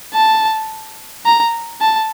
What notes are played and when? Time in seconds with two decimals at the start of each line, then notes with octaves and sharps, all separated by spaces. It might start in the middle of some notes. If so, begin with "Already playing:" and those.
0.14 A5
1.25 A#5
1.81 A5